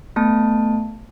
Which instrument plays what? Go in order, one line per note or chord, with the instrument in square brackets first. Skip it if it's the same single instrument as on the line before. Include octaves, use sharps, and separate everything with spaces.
[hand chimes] A3 B3 A5